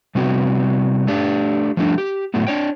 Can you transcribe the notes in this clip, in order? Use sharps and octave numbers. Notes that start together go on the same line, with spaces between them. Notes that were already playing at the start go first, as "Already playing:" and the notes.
C3 G3 B3 C4 F#4
A3 D4 G4
F3 G3 A3 D4
G4
A2 F#3 A3 B3
D4 C#5 G5